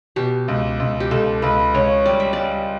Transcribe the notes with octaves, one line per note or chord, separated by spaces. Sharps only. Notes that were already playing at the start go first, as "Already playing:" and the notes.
B2 G4
C#2
C#2
G4
C#2 A4
C#2 B4
C#2 C#5
G3 D5
E5
G3 D5